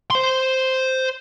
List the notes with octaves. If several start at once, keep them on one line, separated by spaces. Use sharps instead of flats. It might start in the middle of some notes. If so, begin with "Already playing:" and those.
C5 C6